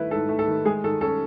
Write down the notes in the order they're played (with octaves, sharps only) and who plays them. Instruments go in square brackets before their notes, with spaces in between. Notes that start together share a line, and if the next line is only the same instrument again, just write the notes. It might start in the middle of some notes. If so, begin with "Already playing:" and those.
Already playing: [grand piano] D#3 A3 E4 B4
G#2 A4
A3
A4
D#3
G#3 G#4
D#3 A4
C#4 A4